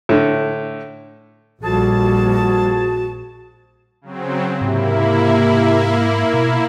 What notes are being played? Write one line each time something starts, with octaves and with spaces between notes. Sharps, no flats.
A2 D3
A#1 F2 G3 F#4 G#4 A5
C#3 F#3 C4
G#2 C3 A#3 E4
B2